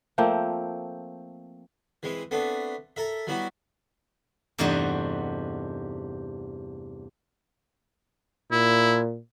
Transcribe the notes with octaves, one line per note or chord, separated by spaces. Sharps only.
F3 A3 A#3 C4
E3 G#3 C4
A3 B3 C4 D4
A4 A#4 E5
F#3 G3 B3 E4 F#4
E2 G2 C3 A3 D#4 F#4
A#2 E4